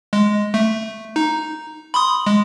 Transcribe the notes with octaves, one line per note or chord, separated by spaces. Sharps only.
G#3
A3
D#4
B5 C6 D#6
G#3